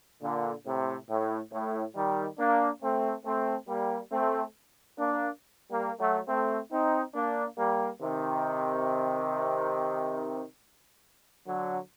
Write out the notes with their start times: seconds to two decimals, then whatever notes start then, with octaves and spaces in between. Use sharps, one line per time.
0.23 A#2 D3
0.66 A2 C3
1.09 A2
1.53 A2
1.96 D#3 G3
2.39 A#3 D4
2.82 A3 C4
3.26 A3 C4
3.69 G3 A#3
4.12 A3 C4
4.98 A#3 D4
5.71 G3 A#3
5.99 F#3 A3
6.28 A3 C4
6.72 C4 D#4
7.15 A#3 D4
7.58 G3 A#3
8.01 C3 D#3
11.48 D3 F#3